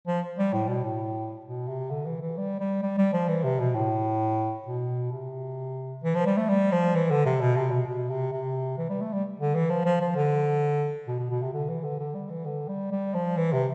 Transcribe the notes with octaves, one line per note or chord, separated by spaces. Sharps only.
F3
G3
A2
B2
A2
B2
C3
D3
E3
E3
G3
G3
G3
G3
F3
E3
C3
B2
A2
B2
C3
E3
F3
G3
A3
G3
F3
E3
D3
C3
B2
C3
B2
B2
C3
C3
E3
G3
A3
G3
D3
E3
F3
F3
F3
D3
B2
B2
B2
C3
D3
E3
D3
D3
G3
E3
D3
G3
G3
F3
E3
C3